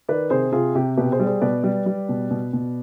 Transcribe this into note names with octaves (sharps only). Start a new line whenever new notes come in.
D#3 B4 D5
C3 G#4 C5
C3 F4 G#4
C3 G4
B2 G4 B4
G#4 C5
G3
G#4 C5
B2 B4 D5
G3
G3
B2
B2
B2